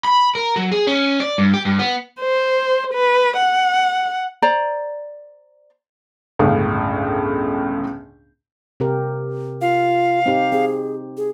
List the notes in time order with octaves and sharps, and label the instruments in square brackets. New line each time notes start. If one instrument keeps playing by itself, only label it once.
[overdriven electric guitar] B5
A#4
F#3
G#4
C#4
D5
G2
G4
G2
B3
[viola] C5
B4
F#5
[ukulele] C5 D5 A#5
[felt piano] G1 C#2 A2 C#3 F5
[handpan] C3 G4 A#4
[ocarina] F4 [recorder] F5
[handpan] C4 D#4 G4
[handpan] C4 [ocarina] G#4
[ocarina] G#4